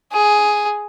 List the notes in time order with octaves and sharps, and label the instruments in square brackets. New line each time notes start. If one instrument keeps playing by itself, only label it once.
[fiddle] G#4